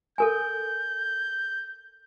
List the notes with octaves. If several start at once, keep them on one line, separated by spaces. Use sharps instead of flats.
A4 A#4 G#5 G6